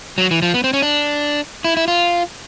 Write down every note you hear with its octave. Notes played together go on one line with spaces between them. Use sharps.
F#3
E3
F3
B3
C4
C#4
D4
E4
E4
F4